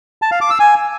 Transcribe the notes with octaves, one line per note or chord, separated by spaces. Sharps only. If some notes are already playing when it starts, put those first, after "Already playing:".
A5
F5
D6
E6
G#5